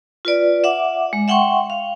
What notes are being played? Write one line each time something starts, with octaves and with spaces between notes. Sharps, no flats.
F4 B4 D5
E5 F#5 D6
G#3
E5 F#5 G5 C6 C#6
F5